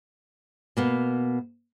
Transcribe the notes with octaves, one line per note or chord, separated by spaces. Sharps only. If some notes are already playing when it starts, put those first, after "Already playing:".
B2 A#3 B3